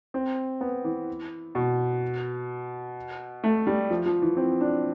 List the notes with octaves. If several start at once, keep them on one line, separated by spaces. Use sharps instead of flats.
C4
B3
E3
B2
A3
G3
F3
F3
E3
C4
D4